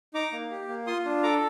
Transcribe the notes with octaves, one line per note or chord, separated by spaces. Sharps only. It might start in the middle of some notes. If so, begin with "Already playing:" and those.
D#4 A#5 D6
A#3
G4
A#3
F4 C6 D#6
D4
A4 A#5 D6